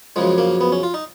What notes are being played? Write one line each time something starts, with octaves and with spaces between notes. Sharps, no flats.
F#2 C#3 F3 G#3
A#3
B3
C#4
F4
D#4